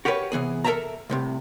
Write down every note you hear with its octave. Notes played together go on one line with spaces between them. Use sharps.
F#4 G4 A#4 B4 C#5
C3 E3 B3 G#4
A4 A#4 D5 E5 A5 A#5
C2 A2 C3